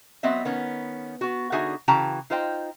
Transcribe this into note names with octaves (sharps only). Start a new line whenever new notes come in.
F#3 B3 C4 D#5 E5
D#3 B3 C#4
B3 F#4
D3 D#4 F#4 G#4 E5 G#5
C#3 E3 F#4 G5 A5 A#5
D#4 F4 C5 D#5 G5